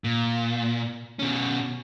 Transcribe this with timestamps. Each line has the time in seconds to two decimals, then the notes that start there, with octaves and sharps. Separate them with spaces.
0.04 A#2
1.19 B2 C#4